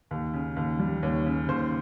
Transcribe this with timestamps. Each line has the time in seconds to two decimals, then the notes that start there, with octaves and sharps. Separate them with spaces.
0.11 D#2
0.34 C#3
0.56 D#2
0.80 G3
1.03 D#2 C#5
1.26 C#3
1.49 D#2 C5